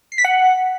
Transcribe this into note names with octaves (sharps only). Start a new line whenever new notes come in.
C7
B6
F#5